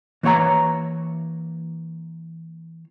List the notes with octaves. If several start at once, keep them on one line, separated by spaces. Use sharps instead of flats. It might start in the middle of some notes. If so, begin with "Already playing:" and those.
E3 A#3 C#5 F#5 A#5